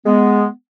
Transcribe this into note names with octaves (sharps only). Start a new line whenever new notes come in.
G#3 B3